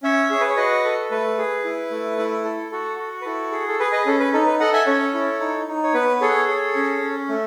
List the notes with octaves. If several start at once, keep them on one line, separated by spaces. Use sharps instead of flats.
C#4 C#5 E5
G#4
B4
C#5
F#4 B4 D#5
A4
A3 B4
G#4
E4
A3
E4
A4
F#4 A4
F#4
B4
E4 A4
G#4
A4
G#4 B4
B4 D#5
C#4 A4
B4
D#4 A4
B4
A4 D#5 F#5
E5 G#5
C#4 A4 C#5
E4
D#4
D#4
C#5
B3 B4
G#4 A4 C#5
G#4
C#4
C#4
A3